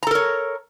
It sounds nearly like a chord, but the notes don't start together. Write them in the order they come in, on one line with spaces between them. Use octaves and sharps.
A#5 A4 A#4 C#5